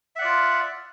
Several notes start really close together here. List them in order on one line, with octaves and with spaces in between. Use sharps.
E5 F#5 D5 F4